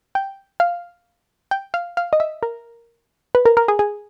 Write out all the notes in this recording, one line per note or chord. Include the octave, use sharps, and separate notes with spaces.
G5
F5
G5
F5
F5
D#5
E5
A#4
B4
A#4
A#4
G#4
G#4